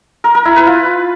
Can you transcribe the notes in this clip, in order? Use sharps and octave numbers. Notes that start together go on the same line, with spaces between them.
A#4
A#4
E4
B4
F4